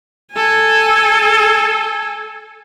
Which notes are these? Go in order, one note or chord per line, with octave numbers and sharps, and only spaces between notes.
A4 G#5